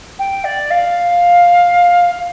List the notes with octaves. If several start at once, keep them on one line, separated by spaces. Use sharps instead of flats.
G5
D5
F5